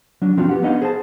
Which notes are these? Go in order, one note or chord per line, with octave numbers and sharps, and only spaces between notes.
F#3 D4
F3 C4 D4 F4 F#4
B3 G4 F#5
B3 D4 D#4 D#5 F5 F#5
G#4 C5 A5